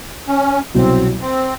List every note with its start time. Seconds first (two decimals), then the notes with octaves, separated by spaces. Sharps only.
0.28 C#4
0.74 C2 B2 F#3 C4
1.22 C4